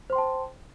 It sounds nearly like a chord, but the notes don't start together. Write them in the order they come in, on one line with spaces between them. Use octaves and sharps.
C5 C6 G5 A5